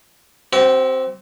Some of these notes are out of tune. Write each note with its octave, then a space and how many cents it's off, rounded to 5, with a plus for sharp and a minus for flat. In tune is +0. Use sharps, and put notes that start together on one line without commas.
C4 +0 F#4 +45